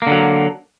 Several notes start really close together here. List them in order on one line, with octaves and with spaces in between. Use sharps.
A#3 D3 F#3